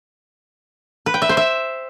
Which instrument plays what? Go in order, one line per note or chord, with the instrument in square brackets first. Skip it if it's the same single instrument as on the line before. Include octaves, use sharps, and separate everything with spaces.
[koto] B4
G5
E5
C5
E5